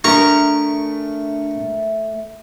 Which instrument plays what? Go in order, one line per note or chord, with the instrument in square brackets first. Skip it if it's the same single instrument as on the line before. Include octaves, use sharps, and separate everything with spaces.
[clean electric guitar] A3 [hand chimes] D4 [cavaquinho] A#4 [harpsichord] C#6